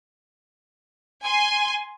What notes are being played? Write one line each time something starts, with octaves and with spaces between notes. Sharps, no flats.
G#5 C6